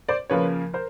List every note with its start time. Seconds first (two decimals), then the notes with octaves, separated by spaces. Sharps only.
0.09 C5 D5
0.30 C#3 F3 A#3 B4 C#5
0.74 A#4 C5